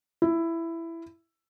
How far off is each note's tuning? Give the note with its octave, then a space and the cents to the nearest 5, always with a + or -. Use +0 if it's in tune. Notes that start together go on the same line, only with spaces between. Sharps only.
E4 +10